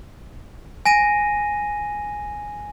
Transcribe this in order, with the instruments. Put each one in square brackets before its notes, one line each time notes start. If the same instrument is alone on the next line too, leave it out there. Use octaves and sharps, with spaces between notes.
[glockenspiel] G#5 A#6 D#7